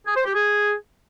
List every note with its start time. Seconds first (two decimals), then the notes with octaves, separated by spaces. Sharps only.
0.06 G#4
0.16 C5
0.25 G4
0.35 G#4